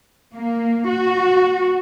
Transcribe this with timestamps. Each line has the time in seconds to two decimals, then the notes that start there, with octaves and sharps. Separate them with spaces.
0.36 A#3
0.89 F#4